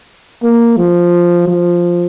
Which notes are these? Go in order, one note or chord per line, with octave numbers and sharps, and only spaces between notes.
A#3
F3
F3